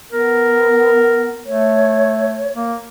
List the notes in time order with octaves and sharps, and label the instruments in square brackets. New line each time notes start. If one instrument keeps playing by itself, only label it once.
[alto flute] B3 [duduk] A#4
[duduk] A3 [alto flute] C#5
[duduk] A#3